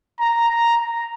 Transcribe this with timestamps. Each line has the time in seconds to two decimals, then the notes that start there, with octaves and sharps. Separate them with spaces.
0.19 A#5
0.48 A#5
0.77 A#5